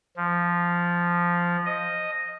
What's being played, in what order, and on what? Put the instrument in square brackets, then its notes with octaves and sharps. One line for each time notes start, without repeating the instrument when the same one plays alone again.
[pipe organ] F3
D#5